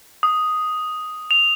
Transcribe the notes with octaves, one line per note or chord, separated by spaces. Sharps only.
D#6
F7